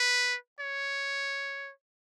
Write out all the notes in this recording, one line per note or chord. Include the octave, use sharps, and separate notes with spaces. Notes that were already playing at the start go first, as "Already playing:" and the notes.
Already playing: B4
C#5